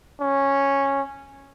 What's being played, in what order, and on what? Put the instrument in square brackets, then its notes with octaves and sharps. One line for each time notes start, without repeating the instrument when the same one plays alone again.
[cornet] C#4